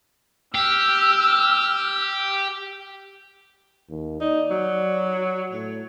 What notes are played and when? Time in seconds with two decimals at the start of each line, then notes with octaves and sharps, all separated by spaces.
0.55 G4 E6 F6
3.89 D#2
4.21 D#4 D5
4.51 F#3
5.52 A2 C#5